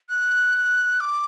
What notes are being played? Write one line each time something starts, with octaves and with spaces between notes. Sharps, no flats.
F#6
D6